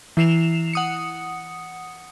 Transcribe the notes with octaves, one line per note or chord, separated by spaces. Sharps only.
E3 E4 C7 E7 F7
F#5 D#6 C#7